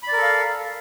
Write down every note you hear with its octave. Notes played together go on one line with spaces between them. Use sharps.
A4 A#4 D5 F5 B5